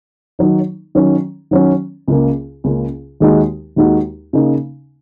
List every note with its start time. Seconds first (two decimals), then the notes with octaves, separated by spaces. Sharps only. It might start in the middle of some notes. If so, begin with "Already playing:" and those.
0.39 D#3 F#3 D#4
0.95 D#3 F#3 C#4
1.51 D#3 F#3 C#4
2.08 C#2 C#3 A#3
2.64 C#2 C#3 A#3
3.20 D#2 D#3 G#3 D#4 F#4
3.76 D#2 D#3 G#3 D#4 F#4
4.33 C#3 A#3 D#4